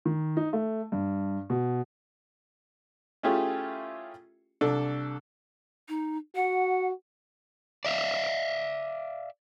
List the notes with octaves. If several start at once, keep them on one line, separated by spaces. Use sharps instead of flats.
D#3
D#4
A3
G2
B2
A3 C#4 E4 F4 G4 G#4
C2 D4 A4
D#4
F#4 F#5
D5 E5 F5